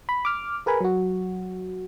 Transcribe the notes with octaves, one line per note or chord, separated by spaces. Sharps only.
B5
D6 F6
G#4 A#4 B4 G#5 B5
F#3 F#4